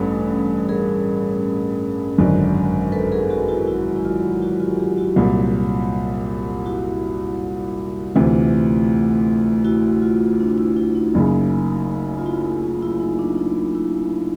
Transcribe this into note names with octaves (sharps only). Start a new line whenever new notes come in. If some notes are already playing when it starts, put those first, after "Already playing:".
Already playing: A1 G2 C#4 A4 B4
G#4 A#4
G#1 F#2 D3
A4 B4
G#4 A#4
F#4 G#4
E4 F#4
E4 F#4
E4
F4
E4 F#4
F4 G4
F4 G4
E4 F#4
C2 A#2 F#3 F4
E4 F#4
D2 C3 E3 F4
E4 F#4
F4
D4
E4
E4
D#4
F#1 F#2 C#3
F4
E4 F#4
F4
E4
D#4
D4
D#4
E4